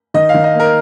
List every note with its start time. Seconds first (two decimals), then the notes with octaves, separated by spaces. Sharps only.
0.14 D#3 D#5
0.29 F5
0.34 D#3
0.44 D#5
0.54 A#3
0.60 A#4